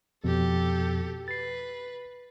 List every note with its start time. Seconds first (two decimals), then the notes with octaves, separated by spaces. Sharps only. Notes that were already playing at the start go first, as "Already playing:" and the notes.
0.24 F2 B2 F3 G4 A4
1.28 B4 A6 C7